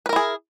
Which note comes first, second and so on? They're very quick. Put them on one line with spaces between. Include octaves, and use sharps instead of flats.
B4 A#4 E4 G#4